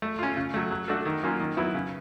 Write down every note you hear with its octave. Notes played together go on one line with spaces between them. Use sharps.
A3
C#4 F4
C#3
F#3 A3
F#3
A3 D4 F#4 A4
D#3
F#3 A#3 C#4 F4
D#3
F#3 B3 E4
C#3